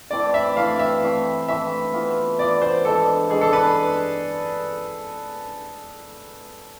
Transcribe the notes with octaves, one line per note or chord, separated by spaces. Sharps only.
E3 A3 C4 E4 D5
E5
E3 A3 C4 E4 F5
E5
E3 A3 C4
E3 A3 C4 E5
E3 B3 F4
E3 B3 F4 D5
C5
E3 G#3 D4 A4
E3 G#3 D4 G#4
A4
B4